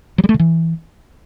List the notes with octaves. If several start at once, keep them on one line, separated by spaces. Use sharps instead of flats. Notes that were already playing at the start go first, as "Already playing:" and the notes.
F#3
G3
A3
C#3
E3